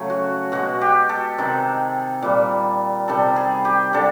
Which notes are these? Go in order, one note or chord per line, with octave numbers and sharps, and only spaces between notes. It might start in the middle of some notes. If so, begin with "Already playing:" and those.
Already playing: C#3 F#3 A3
F#4
B2 G#3 F#4
G4
A4
C3 D#3 G#3
A#2 G3
C3 D#3 G3 A4
G#4
G4
D3 G3 A4